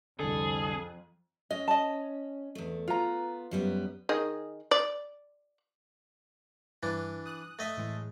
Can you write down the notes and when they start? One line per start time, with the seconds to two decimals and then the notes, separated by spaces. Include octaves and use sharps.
0.19 C2 F2 D3 G#4 A4
1.50 C#4 D#5
1.68 D#5 A5
2.55 E2 A3
2.88 B3 F4 A#5
3.51 F#2 G3 B3
4.09 D#3 G#4 D#5
4.71 D5
6.83 G2 E3 D4
7.26 D#6 F#6
7.59 A3 D#5 E5
7.77 A2 E3 G#3